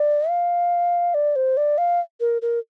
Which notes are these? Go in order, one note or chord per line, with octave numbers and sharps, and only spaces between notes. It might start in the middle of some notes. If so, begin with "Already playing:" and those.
Already playing: D5
F5
D5
C5
D5
F5
A#4
A#4